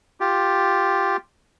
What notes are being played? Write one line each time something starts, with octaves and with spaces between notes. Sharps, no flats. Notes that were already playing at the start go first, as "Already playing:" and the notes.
F4 G4